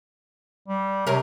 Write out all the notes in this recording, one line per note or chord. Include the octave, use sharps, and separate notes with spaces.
G3
C3 C#4 A#4